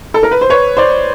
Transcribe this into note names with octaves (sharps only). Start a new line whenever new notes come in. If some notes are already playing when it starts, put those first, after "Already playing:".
A4
A#4
B4
C5
B4 C#5
C5 D5